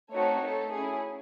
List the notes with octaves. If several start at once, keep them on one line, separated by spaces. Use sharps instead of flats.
A3 C4 D#4 F#4 A4 C#5
A3 D#4 A4
C#4 E4 G#4